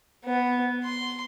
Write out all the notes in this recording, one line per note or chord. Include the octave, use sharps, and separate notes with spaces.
B3
C6